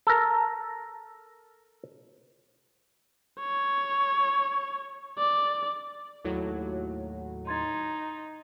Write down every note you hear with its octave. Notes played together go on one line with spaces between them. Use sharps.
A4 A#4
C#5
D5
D#2 A2 F#3
D#4 C6 G#6 A6